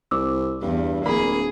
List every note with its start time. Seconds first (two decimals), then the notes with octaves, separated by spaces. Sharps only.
0.11 C2 D6 E6
0.62 E2 G2
1.06 D1 A#3 G#4 B5